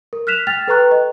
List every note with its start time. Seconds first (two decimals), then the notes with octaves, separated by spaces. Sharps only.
0.13 A#4
0.27 F6 F#6 B6 E7 F7
0.47 G5 F6 A6 F7
0.68 A4 B4 G5 A#5 C#6 F#6
0.91 D#5